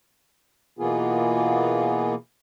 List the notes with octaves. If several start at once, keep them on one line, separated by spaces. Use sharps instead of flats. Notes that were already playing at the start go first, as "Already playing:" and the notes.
B2 E3 A#3 B3 F4 G#4